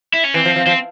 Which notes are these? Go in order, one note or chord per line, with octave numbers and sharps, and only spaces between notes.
E4
C#4
E3 C4
F3
F3
F3 C4